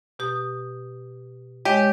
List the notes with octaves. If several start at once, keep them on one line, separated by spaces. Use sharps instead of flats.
B2 G4 D#6
G#3 G4 C#5 D#5